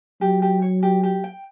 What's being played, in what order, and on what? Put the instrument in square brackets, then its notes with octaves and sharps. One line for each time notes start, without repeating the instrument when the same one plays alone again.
[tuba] F#3 [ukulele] G4
[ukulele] G4
C#5
G4
G4
G5